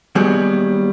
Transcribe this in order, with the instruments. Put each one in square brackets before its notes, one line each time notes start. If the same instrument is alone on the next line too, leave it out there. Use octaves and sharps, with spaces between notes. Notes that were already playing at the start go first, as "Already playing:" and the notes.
[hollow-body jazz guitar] D#2 F#3 G3 B3 G#4